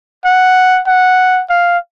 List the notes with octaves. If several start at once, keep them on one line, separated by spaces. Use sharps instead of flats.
F#5
F#5
F5